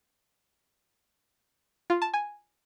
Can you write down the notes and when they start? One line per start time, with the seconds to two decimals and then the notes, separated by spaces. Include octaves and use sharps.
1.90 F4
2.02 A5
2.14 G#5